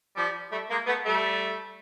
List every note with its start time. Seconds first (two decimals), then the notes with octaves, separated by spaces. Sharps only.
0.17 F3 G3
0.51 G3 A3
0.70 G#3 A#3
0.87 A3 B3
1.05 G3 A3